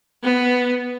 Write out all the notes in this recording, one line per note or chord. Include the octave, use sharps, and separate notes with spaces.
B3